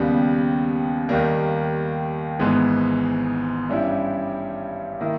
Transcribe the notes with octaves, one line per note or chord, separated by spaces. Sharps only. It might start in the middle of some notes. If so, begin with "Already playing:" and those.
Already playing: D#2 C#3 G3 B3
D#2 D#3 G3 A#3
G#1 G#2 E3 G#3 B3
G2 G3 C#4 E4
D#3 A#3 E4